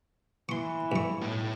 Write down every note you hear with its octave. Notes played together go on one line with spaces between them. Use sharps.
E3 C6 C#6
G2 C#6
B1 A2